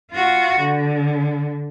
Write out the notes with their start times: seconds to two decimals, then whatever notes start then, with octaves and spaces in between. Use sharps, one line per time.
0.12 F4 F#4
0.60 D3